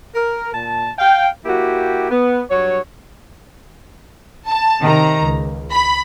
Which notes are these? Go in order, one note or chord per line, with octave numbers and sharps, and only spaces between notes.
A#4
A#2 A5
F5 G5
A#3 E4 F#4 G4
B3
G2 F#3 C#5
A5
C3 D#3 A#5
C#2
B5